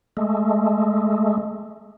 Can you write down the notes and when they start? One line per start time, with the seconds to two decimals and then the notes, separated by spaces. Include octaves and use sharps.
0.17 G#3 A3